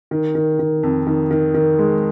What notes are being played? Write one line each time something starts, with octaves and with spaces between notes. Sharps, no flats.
D#3
D#3
D#3
F2
D#3
D#3
D#3
G#3